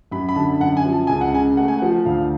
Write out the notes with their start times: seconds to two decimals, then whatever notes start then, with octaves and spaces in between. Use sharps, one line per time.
0.11 F#2 B5
0.29 B5
0.36 D3 A5
0.60 F#2 F#5
0.77 G#5
0.85 F3
0.93 A5
1.07 C#2 G#5
1.21 F#5
1.34 C#3 G#5
1.57 A3 F#5
1.68 G#5
1.78 F#5
1.82 F3
2.06 D2 F5